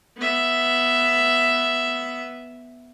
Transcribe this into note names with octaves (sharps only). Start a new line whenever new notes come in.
B3 E5